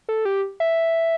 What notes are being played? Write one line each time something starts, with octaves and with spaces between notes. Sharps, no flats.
A4
G4
E5